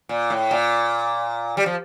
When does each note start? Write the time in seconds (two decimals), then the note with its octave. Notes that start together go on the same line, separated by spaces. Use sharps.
0.09 A#2
0.30 A2
0.51 A#2
1.57 G3
1.66 F3